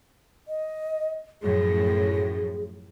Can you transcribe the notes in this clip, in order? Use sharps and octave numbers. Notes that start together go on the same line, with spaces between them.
D#5
F#2 A2 F3 G#4